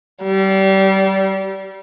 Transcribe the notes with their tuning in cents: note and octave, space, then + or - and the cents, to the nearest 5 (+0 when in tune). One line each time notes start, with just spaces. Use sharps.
G3 -25